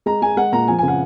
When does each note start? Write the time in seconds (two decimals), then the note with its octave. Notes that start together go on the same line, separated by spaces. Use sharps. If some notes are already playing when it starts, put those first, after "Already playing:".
0.06 G#3 A#5
0.22 G#3 G#5
0.37 G#3 F#5
0.52 A#2 A#5
0.68 F3 G#5
0.79 G#5
0.83 C#3
0.88 F#5